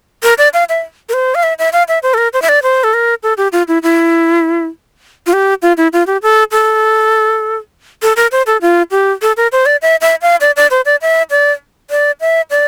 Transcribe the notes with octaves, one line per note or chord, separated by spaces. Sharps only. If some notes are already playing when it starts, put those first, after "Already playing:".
A#4
D5
F5
E5
A#4
C5
F5
E5
E5
F5
E5
C5
A4
A#4
C5
E5
D5
C5
A4
A#4
A4
G4
F4
E4
E4
F4
G4
F4
E4
F4
G4
A4
A4
A4
A#4
C5
A4
F4
G4
A4
A#4
C5
D5
E5
E5
F5
D5
D5
C5
D5
E5
D5
D5
E5
D5